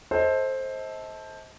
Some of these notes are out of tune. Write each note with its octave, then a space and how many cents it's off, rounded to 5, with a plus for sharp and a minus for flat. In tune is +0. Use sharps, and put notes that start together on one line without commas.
A4 -5 C5 +15 D#5 +30